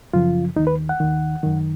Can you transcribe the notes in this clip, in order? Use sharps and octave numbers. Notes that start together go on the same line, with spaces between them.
F#2 C#3 F3 F4
D#2 D#3 D#4
B4
F#5
D#2 D#3
F#2 D#3